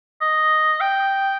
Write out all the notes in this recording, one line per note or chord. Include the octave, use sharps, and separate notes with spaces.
D#5
G5